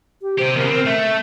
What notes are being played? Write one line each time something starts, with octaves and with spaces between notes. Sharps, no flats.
G4
C3 G4 C5
E2 C#3 A#4
C4
A3 E5